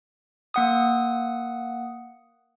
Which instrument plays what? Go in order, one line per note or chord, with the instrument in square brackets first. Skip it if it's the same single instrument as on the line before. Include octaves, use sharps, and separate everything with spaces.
[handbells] A#3 F#5 D#6